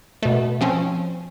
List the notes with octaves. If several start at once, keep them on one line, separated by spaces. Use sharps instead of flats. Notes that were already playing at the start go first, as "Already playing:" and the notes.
B2 A3
F3 C4 C#4